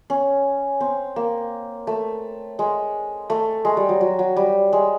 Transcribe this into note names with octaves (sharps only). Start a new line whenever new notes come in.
C#4
C4
A#3
A3
G#3
A3
G#3
G3
F#3
F#3
F#3
G3
G#3